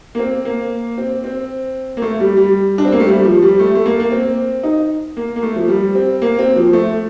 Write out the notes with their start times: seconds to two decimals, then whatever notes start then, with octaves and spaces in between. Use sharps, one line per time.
0.15 A#3
0.19 C4
0.45 A#3
0.98 C4
1.24 C4
1.97 A#3
2.02 A3
2.20 G3
2.37 G3
2.78 D4
2.85 C4
2.92 A#3
3.00 A3
3.07 G3
3.25 F3
3.42 G3
3.60 A3
3.75 A3
3.86 A#3
4.00 A#3
4.12 C4
4.63 D#4
5.17 A#3
5.36 A#3
5.43 A3
5.56 F3
5.68 G3
5.95 C4
6.22 A#3
6.39 C4
6.56 F3
6.73 A3